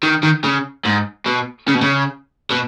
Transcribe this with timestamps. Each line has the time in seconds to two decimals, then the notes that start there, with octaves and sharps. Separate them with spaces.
0.03 D#3
0.23 D#3
0.44 C#3
0.85 G#2
1.26 B2
1.68 C#3
1.75 B2
1.82 C#3
2.50 B2